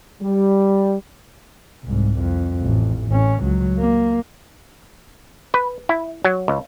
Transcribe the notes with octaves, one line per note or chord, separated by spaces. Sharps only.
G3
C2 G#2
F2
A1
A1 C#4
C#2 F#3
A#3
B4
E4
F#3
C#2